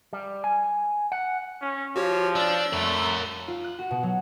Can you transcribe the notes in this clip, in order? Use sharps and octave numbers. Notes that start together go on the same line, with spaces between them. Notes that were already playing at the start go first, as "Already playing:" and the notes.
G3
G#5
F#5
C#4
F3 F#4 G4 C#5
D4 E6 A6
A3 A#4 C#5
F4
F#6
F#4
B2
F#3